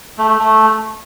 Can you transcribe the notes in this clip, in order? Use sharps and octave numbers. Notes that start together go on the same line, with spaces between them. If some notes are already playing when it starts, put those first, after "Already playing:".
A3
A3
A3